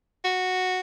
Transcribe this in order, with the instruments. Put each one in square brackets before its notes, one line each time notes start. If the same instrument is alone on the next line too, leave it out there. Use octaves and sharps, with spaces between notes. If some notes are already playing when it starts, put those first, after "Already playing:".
[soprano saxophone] F#4